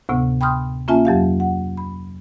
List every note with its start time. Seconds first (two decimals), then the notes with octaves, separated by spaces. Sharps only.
0.09 D2 A2 C3 B3
0.41 G5 B5 C6 D#6 F6 G6
0.88 A#3 C#4 F4 E5 G#5 A5
1.05 F2 F#3 G4 F5
1.40 F#5
1.77 B5